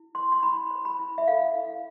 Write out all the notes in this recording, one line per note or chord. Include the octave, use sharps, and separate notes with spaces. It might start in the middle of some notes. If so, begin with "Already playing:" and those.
Already playing: E4
C5 C6
C6
E4 B5
C5
B5
E4
E5
A4 F5
E4